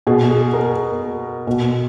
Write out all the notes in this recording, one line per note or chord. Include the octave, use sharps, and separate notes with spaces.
B2 G#4
G#4
A#4
B2